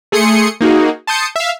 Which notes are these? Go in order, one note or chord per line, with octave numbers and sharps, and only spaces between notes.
A3 G#4 C6 D#6 C#7
A#3 D#4 F#4 G#4
A5 C6 D#6 G6 C#7
E5 F5